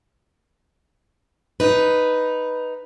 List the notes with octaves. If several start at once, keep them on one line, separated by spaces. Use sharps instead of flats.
D#4 B4